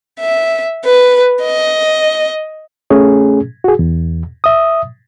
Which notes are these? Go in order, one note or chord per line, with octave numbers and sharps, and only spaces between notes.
E5
B4
D#5
A3 C#4 G#4
F#4 G#4
E2
E5 D#6